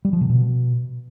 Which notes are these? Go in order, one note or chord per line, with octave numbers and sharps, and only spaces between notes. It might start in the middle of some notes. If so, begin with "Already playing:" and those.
G3
F3
C3
B2